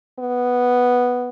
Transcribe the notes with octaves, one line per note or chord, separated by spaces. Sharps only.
B3